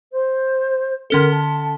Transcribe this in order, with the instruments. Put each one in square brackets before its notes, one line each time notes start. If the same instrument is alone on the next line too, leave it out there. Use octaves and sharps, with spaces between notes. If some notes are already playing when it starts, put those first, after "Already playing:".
[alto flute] C5
[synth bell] D3 C#4 A4 [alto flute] A#4
[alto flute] A5